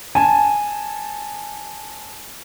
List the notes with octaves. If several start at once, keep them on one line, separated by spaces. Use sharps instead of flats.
G#5 A5